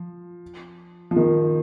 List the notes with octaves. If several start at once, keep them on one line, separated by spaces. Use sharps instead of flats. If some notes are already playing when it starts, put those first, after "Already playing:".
Already playing: F3
F3
D#3